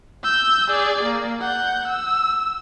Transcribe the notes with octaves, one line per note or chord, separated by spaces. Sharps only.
E6 G6
G#4 D5
A#3
F#5 G6
E6